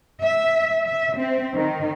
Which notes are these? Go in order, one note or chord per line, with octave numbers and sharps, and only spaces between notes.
E5
E5
C4
D#3